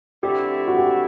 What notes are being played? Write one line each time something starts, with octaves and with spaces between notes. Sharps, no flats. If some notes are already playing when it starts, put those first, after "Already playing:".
D3 A3 C4 E4 G4
F#4
G4